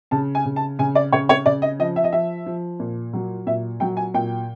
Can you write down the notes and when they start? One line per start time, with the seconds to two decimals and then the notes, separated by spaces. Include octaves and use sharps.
0.11 C#3 A5
0.35 G#5
0.45 C#3
0.56 A5
0.79 C#3 G#5
0.95 D5
1.12 C#3 C#5
1.29 C#5
1.46 C#3 D5
1.62 D#5
1.79 F3 D#5
1.96 E5
2.04 D#5
2.12 F3 E5
2.46 F3
2.80 A#2
3.13 F#3
3.47 A#2 E5
3.80 F#3 G5
3.97 G#5
4.14 A#2 G5